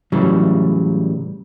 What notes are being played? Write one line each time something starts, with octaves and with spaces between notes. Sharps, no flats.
A2 C#3 E3 F#3 G3